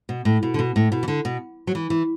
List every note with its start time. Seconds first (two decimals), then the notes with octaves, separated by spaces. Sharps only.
0.09 B2
0.25 A2
0.43 B2
0.54 D3
0.59 B2
0.76 A2
0.92 B2
1.03 E3
1.08 D3
1.25 B2
1.67 F#3
1.75 E3
1.90 E3